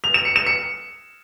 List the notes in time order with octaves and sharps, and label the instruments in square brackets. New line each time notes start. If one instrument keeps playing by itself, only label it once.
[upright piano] F7
E7
C#7
E7
C#7